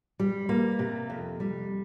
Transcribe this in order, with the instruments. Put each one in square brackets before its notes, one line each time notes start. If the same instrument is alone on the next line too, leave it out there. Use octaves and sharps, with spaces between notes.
[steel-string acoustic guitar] G3
A#3
C3
F2
G3